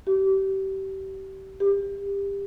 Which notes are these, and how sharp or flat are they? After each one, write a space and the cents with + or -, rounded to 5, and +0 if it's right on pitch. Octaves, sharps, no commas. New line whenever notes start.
G4 -30
G4 +25